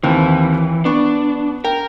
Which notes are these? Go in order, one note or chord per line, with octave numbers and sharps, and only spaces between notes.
D#2 E3 C4
B3 D4 C#6
A#4 G5